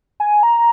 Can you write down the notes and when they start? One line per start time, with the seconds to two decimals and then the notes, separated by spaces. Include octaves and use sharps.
0.20 G#5
0.43 A#5